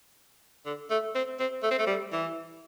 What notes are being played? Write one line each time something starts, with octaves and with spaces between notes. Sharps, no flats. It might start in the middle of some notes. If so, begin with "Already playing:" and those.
D3
A3
C4
C4
A3
C4
A3
G3
E3